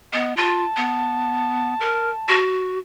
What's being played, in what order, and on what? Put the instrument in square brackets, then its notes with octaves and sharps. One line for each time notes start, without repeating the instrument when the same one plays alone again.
[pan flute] B3 [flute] D#5
[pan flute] F4 [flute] A5
[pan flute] B3
A#4
F#4